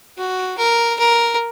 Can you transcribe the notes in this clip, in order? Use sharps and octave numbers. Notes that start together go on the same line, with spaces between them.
F#4
A#4
A#4